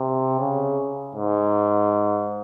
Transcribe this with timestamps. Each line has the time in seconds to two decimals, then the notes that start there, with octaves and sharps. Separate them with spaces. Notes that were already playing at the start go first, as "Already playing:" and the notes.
Already playing: C3
0.39 C#3
1.15 G#2